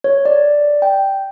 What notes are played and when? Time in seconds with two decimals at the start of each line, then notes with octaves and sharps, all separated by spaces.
0.04 C#5
0.25 D5
0.82 G5